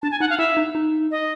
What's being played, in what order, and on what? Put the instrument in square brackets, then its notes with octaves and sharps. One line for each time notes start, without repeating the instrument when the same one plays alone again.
[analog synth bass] D4 [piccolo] A5
[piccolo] G#5
[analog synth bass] D#4 [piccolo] F#5
[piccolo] F5
[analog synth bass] E4 [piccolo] E5
[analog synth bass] D#4
D#4
[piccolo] D#5